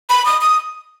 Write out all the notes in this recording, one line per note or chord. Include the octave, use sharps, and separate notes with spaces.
B5
D#6
D#6